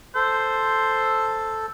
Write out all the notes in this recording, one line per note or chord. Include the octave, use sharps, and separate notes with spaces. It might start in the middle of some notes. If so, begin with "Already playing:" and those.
A4 C5